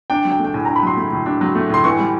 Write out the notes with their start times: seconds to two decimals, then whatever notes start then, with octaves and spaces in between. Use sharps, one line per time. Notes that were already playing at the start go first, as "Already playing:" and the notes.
0.10 D4 G5
0.25 F#3
0.32 G5
0.40 A3
0.45 G5
0.54 A2 G#5
0.65 D4 A#5
0.76 B5
0.83 F#3 C6
0.97 A3
1.12 A2
1.26 D4
1.41 F#3
1.55 A3
1.70 A2 C6
1.84 E3 C#6
1.99 G3